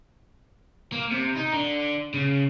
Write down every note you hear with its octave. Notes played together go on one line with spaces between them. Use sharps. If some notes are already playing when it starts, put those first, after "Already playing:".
A#3
C3
D#4
D3
C#3